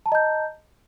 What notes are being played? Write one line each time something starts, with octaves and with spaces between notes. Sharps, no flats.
D#5 A5 A#5 G6